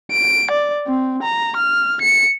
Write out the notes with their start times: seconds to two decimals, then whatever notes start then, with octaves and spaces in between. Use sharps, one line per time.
0.11 D7
0.51 D5
0.87 C4
1.23 A#5
1.56 F6
2.01 C#7